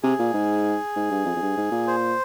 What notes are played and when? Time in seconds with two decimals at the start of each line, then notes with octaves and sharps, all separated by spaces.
0.03 C3 G#4
0.19 A#2
0.33 G#2
0.96 G#2
1.11 G2
1.25 F2
1.36 F2
1.42 G2
1.57 G#2
1.71 A#2
1.87 C5